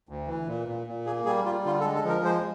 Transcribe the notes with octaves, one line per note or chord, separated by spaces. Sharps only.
D2
E3
A#2
A#2
A#2
A#3 G#4
G3 G#4
G3 F4
D3 F4
A4
G#3
A4
F3 A#4
G#3 C5